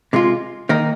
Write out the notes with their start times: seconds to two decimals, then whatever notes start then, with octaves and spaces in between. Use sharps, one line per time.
0.13 C3 G#3 F4
0.69 D#3 A#3 D#4